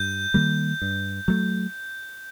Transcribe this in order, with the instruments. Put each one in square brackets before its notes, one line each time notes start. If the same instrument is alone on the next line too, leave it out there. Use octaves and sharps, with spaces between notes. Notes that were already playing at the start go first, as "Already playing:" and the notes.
Already playing: [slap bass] G2 [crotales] G6
[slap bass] D#3 G3 A#3
G2
F#3 A3